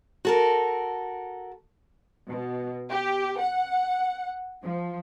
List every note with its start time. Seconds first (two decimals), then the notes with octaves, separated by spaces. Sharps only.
0.25 F#4 A4 A#4
2.29 B2
2.90 G4
3.38 F#5
4.62 F3